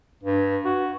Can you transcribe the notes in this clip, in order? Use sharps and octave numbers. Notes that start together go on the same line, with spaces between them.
G2
F#4